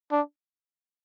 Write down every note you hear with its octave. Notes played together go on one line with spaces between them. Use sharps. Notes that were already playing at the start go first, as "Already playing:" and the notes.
D4